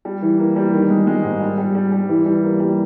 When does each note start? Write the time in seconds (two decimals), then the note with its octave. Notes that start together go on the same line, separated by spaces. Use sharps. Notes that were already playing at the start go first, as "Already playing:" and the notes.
0.05 G3
0.22 E3
0.39 A#3
0.56 G3
0.73 D#3
0.90 G#3
1.07 G#3
1.24 G#2
1.40 G3
1.58 G3
1.75 G3
1.92 G3
2.09 E3
2.26 G3
2.44 A#3
2.60 G3